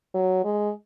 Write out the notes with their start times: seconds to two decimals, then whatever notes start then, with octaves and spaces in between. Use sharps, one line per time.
0.14 F#3
0.45 G#3